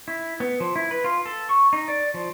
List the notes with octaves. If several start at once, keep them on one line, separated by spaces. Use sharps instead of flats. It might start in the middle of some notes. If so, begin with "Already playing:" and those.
E4
B3
F3
E4
B4
F4
A4
C#6
D#4
D5
F3